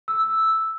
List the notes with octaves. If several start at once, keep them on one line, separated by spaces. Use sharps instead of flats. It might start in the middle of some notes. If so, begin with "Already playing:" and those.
E6